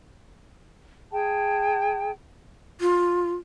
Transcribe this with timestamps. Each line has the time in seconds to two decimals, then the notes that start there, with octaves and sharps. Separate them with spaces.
1.12 G#4 G5 A5
2.80 F4